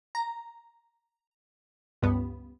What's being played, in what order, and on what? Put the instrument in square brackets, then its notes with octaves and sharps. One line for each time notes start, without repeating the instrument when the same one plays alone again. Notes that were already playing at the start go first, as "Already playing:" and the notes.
[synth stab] A#5
C#2 G2 B3